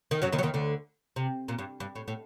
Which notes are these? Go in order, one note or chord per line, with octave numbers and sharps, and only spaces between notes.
D#3
F#2 F#3
D#2 D#3
F#3
D#2 D#3
D2 D3
C3
A#2
G2
G2
A2
A2